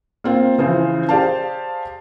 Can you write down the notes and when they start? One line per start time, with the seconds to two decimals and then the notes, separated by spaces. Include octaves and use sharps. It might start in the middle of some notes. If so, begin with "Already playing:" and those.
0.24 A#3 C4 F4
0.58 C#3 E3 F3 C5
1.09 G4 G#4 C5 D5 F5 A5